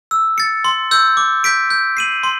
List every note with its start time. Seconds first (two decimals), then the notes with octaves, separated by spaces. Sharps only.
0.11 E6
0.38 A6 C#7
0.64 C6
0.91 E6 G6
1.17 D6
1.44 G6 B6 D7
1.70 G6
1.97 C7 D#7 F#7
2.23 C6